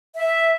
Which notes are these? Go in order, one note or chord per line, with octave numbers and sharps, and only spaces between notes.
E5